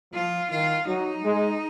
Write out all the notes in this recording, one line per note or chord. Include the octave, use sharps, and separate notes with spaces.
F3 F4
D#3 F4
F#3 D#4
G#3